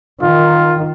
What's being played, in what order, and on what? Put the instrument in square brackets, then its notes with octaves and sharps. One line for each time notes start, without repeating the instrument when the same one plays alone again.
[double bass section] D#3 [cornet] F4